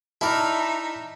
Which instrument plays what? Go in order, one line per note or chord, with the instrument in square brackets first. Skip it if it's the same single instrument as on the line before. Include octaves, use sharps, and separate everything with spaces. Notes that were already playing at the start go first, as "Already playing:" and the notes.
[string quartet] D#4 E5 [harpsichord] E4 D5 [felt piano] A5 B5 F6